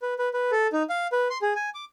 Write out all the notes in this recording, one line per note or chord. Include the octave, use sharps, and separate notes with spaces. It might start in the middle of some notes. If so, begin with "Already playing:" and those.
B4
B4
B4
A4
D#4
F5
B4
C6
G#4
G#5
D6